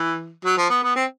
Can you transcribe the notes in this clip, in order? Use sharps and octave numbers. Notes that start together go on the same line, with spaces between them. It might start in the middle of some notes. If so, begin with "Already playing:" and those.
Already playing: E3
F#3
F3
B3
B3
C4